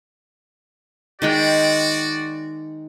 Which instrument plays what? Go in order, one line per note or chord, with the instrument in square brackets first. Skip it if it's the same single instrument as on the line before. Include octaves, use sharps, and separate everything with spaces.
[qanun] D#3 G#3 G5 [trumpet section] F#4 D5